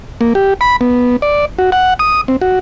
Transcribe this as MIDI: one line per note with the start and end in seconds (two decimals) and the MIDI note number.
0.21 0.33 58
0.35 0.54 67
0.61 0.76 83
0.81 1.16 59
1.22 1.45 74
1.59 1.70 66
1.72 1.94 78
1.99 2.21 87
2.28 2.36 60
2.41 2.59 66